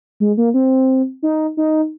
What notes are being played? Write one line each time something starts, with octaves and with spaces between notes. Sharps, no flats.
G#3
A#3
C4
D#4
D#4